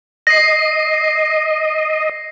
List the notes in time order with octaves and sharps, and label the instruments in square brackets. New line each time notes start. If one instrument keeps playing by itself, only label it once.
[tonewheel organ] D#5 [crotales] A#6 C7